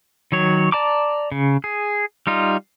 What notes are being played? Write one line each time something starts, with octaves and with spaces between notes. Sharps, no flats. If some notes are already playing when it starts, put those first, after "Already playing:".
D#3 F#3 C#5
D5 A5 A#5 D6
C#3
G#4
G3 D#4 F4